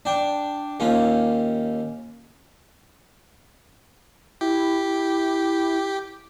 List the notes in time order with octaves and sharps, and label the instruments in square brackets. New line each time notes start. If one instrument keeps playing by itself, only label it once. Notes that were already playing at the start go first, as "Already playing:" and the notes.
[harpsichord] D4 G5
D#2 C#4 F4
[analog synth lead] E4 [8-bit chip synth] G4